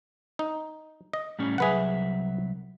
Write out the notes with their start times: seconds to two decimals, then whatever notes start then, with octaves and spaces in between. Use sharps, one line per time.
0.39 D#4
1.13 D#5
1.39 A2 G3 C#4
1.58 C2 F#3 G#4 B4 E5 F#5